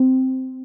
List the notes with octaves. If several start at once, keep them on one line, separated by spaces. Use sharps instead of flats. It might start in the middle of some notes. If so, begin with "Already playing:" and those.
Already playing: C4